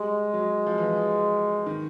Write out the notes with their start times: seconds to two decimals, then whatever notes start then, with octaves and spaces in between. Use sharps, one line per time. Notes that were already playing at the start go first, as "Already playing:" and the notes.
Already playing: G3 G#3
0.34 F#3
0.67 F3
0.78 E3
1.66 D#3